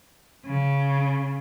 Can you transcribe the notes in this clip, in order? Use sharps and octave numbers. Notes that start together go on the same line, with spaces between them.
C#3